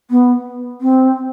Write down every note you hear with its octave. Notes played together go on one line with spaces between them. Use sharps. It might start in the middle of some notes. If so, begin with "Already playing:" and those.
B3
C4